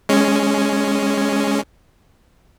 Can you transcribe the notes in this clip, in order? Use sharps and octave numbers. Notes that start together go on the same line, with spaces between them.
G#3 C#4